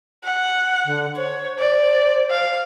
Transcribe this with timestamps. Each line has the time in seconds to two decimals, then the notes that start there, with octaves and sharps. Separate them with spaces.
0.24 F#5
0.86 D3
1.16 C5 C#5
1.59 D5
2.31 F5